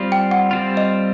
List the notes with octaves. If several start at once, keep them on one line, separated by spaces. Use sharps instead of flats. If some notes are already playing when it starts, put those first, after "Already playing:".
Already playing: G3 C4 F4
G5
F#5
G3 C4 F4
D#5